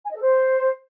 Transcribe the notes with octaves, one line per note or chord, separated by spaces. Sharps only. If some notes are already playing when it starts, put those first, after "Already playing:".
G#5
D#5
A4
C5